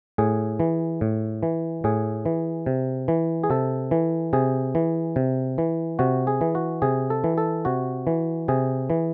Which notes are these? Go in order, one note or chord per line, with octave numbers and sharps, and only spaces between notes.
A2 G#4
E3
A2
E3
A2 G#4
E3
C3
E3
G#4
C3 A4
E3
C3 G#4
E3
C3
E3
C3 F#4
G#4
E3
F#4
C3 G#4
A4
E3
A4
C3 F#4
E3
C3 G#4
E3